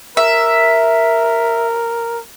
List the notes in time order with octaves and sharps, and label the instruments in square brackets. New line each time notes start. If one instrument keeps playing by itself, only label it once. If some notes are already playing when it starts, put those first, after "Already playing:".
[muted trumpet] A#4 [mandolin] E5